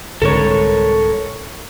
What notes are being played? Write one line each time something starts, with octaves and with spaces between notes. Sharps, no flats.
C2 G#2 D3 A4 A#4 C#5